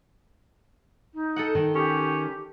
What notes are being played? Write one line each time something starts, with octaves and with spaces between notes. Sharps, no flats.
D#4
A4 D#5 F#5
D#3
C#4 G4